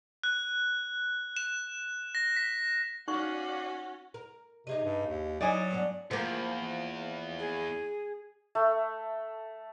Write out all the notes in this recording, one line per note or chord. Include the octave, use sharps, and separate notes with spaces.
F#6
E7
A#6
B6
C#4 D#4 F#4 D5 F5 F#5 C#6 F#6
A#4
C3 D#4 G#4 D#5
G2
D#2
F#3 D#4 E4 D5 D#5 G#5
G2 B3 D4
E2 F3 A#3
G#4
A3